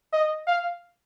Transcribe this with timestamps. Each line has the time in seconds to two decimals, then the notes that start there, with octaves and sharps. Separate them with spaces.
0.13 D#5
0.47 F5